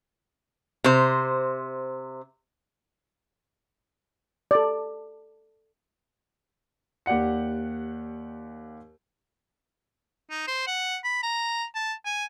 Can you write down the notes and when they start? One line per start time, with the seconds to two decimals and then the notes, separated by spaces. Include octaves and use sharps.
0.84 C3 C5
4.51 A4 D5
7.06 D#2 G4 D5 F#5 C#7
10.30 D#4
10.47 C5
10.67 F#5
11.04 B5
11.23 A#5
11.75 A5
12.05 G#5